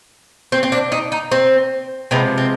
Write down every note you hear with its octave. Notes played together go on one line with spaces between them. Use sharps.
C4
C4
D4
D#4
D#4
C4
C3 F3 G#3 B3
C4